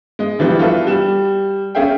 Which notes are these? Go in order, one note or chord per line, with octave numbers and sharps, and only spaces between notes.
G#3 D#5
D3 E3 F3 G3 B3
F4 F#4 A4 B4 E5
G3 E7
C#4 G#4 E5 F5 G5